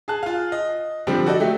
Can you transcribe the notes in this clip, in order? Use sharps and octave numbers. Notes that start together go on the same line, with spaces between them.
G#4 A5 F#6
F4 F5
D#5
D3 F3 G3 C4 D4
F#4 A4 D5 D#5
F#3 A3 G4